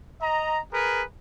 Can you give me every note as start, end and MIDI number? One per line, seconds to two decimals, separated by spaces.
0.21 0.61 75
0.21 0.61 82
0.72 1.02 68
0.72 1.02 70
0.72 1.02 71